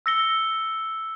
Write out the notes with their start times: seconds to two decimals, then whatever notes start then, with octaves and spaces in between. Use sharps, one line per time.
0.06 E6 A#6 C#7 G7